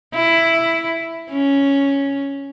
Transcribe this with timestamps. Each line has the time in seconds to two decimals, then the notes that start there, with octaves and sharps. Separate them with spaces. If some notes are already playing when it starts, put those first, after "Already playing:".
0.14 E4
1.30 C#4